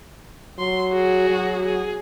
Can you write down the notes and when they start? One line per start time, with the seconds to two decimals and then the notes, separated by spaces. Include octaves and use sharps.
0.59 F#3 C6
0.92 F#4 G#4
1.30 F#3
1.65 G#4